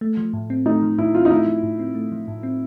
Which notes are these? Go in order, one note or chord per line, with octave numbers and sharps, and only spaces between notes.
A3
F3
A2
C4
A3 D#4
F3
A2 E4
C4 F4
D#4
A3 E4
F3
A2
C4
A3
F3
A2
C4